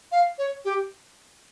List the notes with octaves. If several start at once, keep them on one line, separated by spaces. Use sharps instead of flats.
F5
C#5
G4